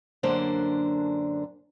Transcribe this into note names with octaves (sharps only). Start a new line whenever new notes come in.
F#2 D3 A#3 D4 C5